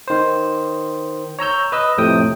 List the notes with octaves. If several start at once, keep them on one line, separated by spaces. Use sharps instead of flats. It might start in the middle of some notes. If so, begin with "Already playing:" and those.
D#3 C5
C#5 A#5 E6 G6
B4 D#5 E6
F2 A2 C3 G5 D#6